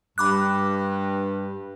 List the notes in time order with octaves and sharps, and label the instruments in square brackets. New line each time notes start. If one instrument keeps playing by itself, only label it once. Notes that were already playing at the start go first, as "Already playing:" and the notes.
[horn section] G2 [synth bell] B5 D6 F#6